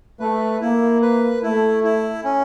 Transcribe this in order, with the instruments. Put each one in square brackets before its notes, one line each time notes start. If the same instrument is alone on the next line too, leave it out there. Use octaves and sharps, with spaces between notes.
[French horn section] A3 [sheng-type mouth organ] B4
[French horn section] A#3 [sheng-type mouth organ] E4
[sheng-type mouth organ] B4
[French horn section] A3 [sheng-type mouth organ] E4
[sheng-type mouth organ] E4
C#4